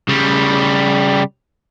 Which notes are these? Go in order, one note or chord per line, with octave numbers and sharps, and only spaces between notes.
C#3 G3